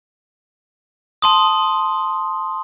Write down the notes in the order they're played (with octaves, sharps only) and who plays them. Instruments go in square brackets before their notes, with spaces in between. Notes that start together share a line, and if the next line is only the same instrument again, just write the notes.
[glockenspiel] A5 C6 D#6